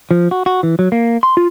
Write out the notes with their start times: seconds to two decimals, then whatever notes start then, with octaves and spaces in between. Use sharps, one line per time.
0.11 F3
0.31 F#4
0.46 F#4
0.63 E3
0.79 F#3
0.92 A#3
1.23 C6
1.37 F4